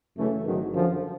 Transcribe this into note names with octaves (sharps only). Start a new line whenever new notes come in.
F#2 C#3 E3 A3 C#4
G#1 G#2 D#3 F#3
F#2 D3 F3